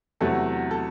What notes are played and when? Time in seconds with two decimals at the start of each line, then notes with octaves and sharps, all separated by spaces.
0.21 E2 C3 F#3 A3 A4
0.71 A4